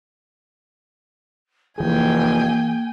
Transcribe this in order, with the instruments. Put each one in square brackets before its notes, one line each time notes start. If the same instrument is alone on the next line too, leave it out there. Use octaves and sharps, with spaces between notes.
[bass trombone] F1 [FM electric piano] E3 G#4 [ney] A#3 [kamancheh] G5 G#5